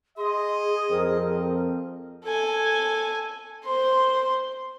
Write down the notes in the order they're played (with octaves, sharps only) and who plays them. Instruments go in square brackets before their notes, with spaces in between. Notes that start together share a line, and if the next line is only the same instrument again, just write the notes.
[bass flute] G#4 [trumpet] D#5 [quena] C6
[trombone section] F2 C4 [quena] A#4
[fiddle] A4 G#5
C5 C6